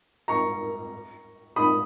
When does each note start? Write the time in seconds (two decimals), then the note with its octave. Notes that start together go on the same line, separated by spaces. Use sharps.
0.28 A#5 C#6
1.56 B5 D#6